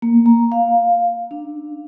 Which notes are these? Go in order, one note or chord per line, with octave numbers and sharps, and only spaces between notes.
A#3
A#5
F5
D4